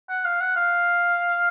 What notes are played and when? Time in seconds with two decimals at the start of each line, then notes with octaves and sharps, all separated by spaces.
0.10 F#5
0.25 F5
0.40 F#5
0.56 F5